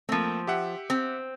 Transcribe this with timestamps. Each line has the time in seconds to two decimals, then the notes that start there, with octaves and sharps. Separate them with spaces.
0.09 F3 A3 A#3 C4
0.47 G4 E5 F#5
0.90 C4